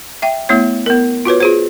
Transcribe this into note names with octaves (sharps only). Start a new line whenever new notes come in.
E5 G5
A3 B3 E4 C#5
B3 A#4
F4 F#4 B4 C#5
F4 G#4 C5